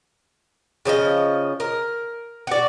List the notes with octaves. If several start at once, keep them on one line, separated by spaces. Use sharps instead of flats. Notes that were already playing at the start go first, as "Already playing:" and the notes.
C#3 F3 G#4 D#5
A#4
F#4 D5